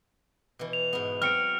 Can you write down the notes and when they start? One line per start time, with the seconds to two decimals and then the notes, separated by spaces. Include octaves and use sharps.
0.59 B2 E3
0.73 F7
0.93 G#2 B3
1.22 F#3 C4 F#4 F6 C#7 D7